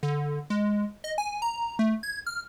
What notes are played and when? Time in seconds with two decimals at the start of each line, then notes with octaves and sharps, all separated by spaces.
0.03 D3
0.50 G#3
1.04 D#5
1.18 G#5
1.42 A#5
1.79 A3
2.03 G#6
2.26 F6